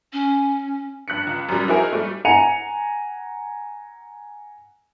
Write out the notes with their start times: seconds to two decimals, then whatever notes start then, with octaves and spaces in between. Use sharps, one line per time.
0.13 C#4
1.08 G2 F#6 B6 C#7
1.27 C#2
1.49 F#2 G3
1.68 D#4 E4 F#4 G#4 A#4 C5
1.92 G3 A3
2.25 F#5 G#5 A#5 C#7 D#7 F7